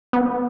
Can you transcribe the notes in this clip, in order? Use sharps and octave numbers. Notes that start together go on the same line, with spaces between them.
B3